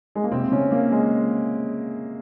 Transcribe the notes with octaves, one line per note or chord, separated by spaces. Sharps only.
G#3
A#3
C3 C4
C#3 C#4
A#3
G#3